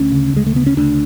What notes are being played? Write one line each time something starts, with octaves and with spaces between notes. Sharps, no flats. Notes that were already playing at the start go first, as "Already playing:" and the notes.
Already playing: D2 C#4
C#3
D2 G#3
A3
C#3 B3
C#4
D2 D4